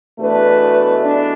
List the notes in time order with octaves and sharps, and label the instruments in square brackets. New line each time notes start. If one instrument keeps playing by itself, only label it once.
[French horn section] E2 B2 A3 D4 B4
D4